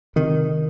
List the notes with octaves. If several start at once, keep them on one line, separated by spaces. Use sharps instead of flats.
C3 D#3